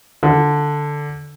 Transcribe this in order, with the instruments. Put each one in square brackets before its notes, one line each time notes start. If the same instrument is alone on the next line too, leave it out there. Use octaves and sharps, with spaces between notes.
[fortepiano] D3